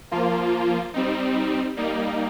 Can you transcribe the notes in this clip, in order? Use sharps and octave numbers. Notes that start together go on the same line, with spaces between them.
F3 A#3 F4
G3 C4 D#4
G3 A#3 D#4